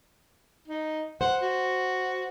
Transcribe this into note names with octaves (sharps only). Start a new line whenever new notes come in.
D#4
C5 F#5
F#4